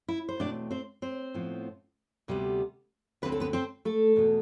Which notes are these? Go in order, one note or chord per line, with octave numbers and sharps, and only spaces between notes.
E4
C5
E2 B2 A3 C4 D4 D5
C4 C5
C4 C5
A2 F3 B3
D2 C3 G3 B3
D2 D3 G3 C4 B4
A4
B3 B4
C4 C5
A3 A4
E2 B2 B3